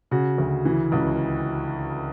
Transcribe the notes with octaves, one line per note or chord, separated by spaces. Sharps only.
C#3 F#4
D2
E3
C#2